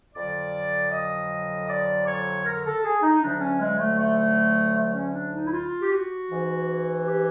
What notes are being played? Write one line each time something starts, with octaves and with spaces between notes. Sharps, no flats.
F2 D3 F#3 D5
D#5
D5
C#5
A#4
A4
G#4
D#4
D2 D3 F#3 D4
C#4
G#3
A3
A3
A3
C#4
D4
D#4
E4
F4
G4
F#4
G#2 E3
G4